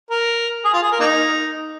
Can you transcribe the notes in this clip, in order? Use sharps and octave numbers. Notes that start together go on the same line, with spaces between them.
A#4
G#4
F4
G#4
A#4
A#3 D#4